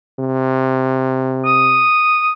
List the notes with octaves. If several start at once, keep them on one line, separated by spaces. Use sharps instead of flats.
C3
D#6